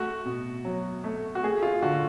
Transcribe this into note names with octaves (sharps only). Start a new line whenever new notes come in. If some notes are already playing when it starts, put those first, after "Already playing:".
Already playing: A3 F#4
B2
F#3
A3
F#4
A3 G#4
F4
D3 F#4